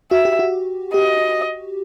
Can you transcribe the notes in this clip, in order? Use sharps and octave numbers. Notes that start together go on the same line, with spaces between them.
F#4 E5
G4
F#4
G4 D#5